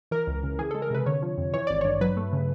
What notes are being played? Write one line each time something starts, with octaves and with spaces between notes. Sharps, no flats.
E3 A#4
C#2
C#3
E3 G#4
G#3 A4
A#4
C3 B4
D3 C#5
F3
F2
E3 C#5
G#1 D5
G2 C#5
F#3 B4
A3
C#3